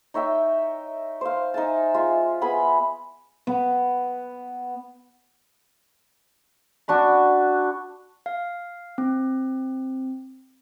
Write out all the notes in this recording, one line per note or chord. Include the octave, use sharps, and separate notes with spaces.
D#4 C#5 E5 G5
C5 F5
D#4 E5 G#5 A5
G#3 F4 E5
B3 G#4 B5
B3
D4 F#4 B5
F5
C4